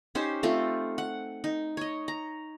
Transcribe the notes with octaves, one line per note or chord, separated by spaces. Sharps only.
C#4 D#4 G4 C5
A3 C4 F4 A4
F#5
D#4
C#5 D#5
A#5